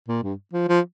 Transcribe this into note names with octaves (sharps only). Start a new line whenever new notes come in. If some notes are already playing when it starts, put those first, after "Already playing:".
A#2
G2
F3
F3